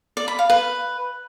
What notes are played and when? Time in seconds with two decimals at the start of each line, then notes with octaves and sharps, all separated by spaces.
0.17 D5
0.28 B5
0.39 F5
0.50 B4